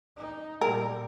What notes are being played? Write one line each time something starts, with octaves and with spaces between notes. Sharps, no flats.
D#4
A#2 G3 A#4